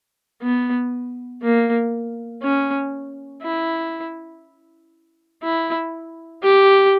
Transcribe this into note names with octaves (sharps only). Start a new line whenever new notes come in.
B3
A#3
C#4
E4
E4
G4